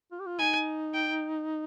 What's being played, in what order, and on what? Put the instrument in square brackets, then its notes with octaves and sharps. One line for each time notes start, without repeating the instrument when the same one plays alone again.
[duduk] F4
G4
F4
[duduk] D#4 [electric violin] G#5
[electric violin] G5